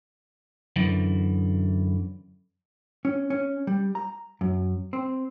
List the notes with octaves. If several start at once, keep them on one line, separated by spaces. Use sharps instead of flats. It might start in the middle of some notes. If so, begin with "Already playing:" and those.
F#2 D3 E3
C#4
C#4
G3
A#5
F#2
C4